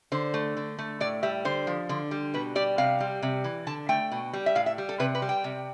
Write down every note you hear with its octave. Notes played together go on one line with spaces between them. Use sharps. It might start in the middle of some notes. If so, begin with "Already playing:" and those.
D3 C5
A3
D3
A3
A2 D5
G3 E5
D3 C5
F3
D3
G3
B2 B4
G3 D5
C3 F5
G3
C3
E3
D3 A5
A3 G5
B2
G3
E5
A2 F5
E5
G3
A4
C3 B4
B4
G3
G5
C3